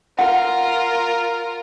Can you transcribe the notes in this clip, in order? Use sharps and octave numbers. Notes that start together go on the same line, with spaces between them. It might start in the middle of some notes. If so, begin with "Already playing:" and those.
F4 A#4 F#5